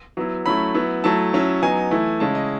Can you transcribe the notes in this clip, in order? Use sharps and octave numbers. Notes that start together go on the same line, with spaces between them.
F#3 B3 E4
F#3 A3 C#4 E4 B5
F#3 B3 E4
F#3 A3 E4 A5
F#3 C#4 E4
F#3 B3 D#4 G#5
E3 A3 E4
C#3 G#3 C#4 E4 A5
D#5